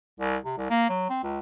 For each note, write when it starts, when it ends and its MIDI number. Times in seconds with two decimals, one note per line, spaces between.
0.20 0.36 36
0.45 0.57 48
0.57 0.70 36
0.70 0.88 58
0.89 1.09 54
1.10 1.22 60
1.23 1.40 37